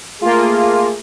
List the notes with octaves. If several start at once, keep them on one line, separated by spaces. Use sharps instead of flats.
A3 A#3 F4 G#4